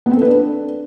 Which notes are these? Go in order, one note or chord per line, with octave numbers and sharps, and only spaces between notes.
B3
C4
A4
B4
D4